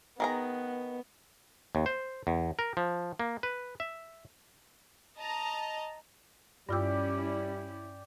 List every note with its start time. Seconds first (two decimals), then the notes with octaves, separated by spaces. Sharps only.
0.20 D#3 B3 G#4 A#5
1.75 D#2
1.86 C5
2.27 E2
2.59 A#4
2.77 F3
3.20 A#3
3.43 B4
3.80 E5
5.18 D#5 A5 A#5
6.69 G2 G3 C#4 E4 F4 G4 D5 E6